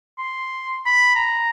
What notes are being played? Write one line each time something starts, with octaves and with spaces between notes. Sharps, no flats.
C6
B5
A#5